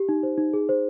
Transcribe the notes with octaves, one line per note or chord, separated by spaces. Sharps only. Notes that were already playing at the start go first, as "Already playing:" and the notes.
Already playing: G4
D#4
C5
D#4
G#4
C5